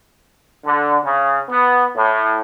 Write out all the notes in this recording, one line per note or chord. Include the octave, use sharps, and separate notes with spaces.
D3
C#3
B3
A2